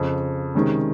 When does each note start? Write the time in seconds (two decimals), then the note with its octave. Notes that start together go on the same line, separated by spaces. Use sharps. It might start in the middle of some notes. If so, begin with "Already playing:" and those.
Already playing: F2 C#3 F3
0.55 C3 D#3 G#3 C#4